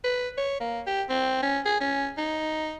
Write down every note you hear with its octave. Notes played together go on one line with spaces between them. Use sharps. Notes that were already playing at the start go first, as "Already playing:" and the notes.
B4
C#5
A#3
G4
C4
C#4
G#4
C#4
D#4